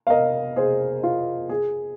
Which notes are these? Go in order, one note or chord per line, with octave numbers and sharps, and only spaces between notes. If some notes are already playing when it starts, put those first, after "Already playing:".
F5
A#4 D#5
G#4 C5
F4
G#4